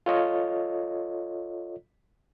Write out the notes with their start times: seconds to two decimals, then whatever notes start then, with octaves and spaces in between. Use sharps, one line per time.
0.06 F4 A4 C#5 D#5